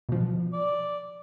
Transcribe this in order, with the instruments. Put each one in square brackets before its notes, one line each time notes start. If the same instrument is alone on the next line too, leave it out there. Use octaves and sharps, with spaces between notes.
[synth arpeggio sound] B2 F3
[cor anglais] D5